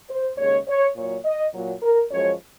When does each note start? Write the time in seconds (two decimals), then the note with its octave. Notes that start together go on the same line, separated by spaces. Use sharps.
0.10 C5
0.38 D#2 C#3 G#3 C#5
0.68 C#5
0.96 A#2 F#3 C#5
1.25 D#5
1.54 A#2 F#3
1.83 A#4
2.12 F#2 F3 G#3 C#5